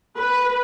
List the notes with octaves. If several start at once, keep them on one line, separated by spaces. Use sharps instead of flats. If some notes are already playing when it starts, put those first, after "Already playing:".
B4